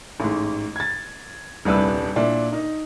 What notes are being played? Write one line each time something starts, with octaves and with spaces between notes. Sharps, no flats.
A1 G#2
G#6 A6
D#1 C2 D4 B4 E6
A#2 D4 E4
D#4